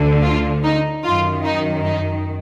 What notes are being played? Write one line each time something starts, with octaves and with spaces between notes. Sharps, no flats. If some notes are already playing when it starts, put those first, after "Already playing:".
Already playing: D2 D3
F4
D#4
F#2 D#3 F4
D#4
D#4